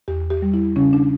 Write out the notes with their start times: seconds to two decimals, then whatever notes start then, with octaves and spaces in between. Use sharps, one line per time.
0.08 E2 G4
0.30 G4
0.42 G3
0.54 E4
0.76 C#3 C#4
0.93 D4